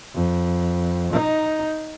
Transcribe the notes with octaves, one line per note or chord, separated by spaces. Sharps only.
F2
D#4